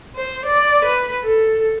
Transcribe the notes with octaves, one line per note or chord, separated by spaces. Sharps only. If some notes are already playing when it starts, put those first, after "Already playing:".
C5
D5
B4
A4